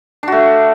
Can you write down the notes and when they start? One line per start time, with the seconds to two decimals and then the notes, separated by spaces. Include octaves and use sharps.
0.23 D4
0.28 F#4
0.32 A3